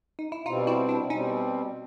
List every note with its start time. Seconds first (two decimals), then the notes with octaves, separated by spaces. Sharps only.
0.19 D#4
0.32 E4
0.46 B2 G3 C4 D#4 F4
0.67 E4 F#4
0.89 D4 E4
1.10 B2 G3 C4 C#4 D#4